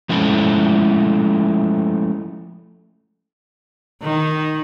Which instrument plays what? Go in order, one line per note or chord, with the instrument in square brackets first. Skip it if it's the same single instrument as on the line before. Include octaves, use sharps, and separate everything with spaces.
[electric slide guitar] F3 G#3 A3 C#4 E4 A4
[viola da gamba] D#3